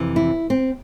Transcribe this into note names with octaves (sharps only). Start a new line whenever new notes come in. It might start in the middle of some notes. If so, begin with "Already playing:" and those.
Already playing: F2 C3 E3
E4
C4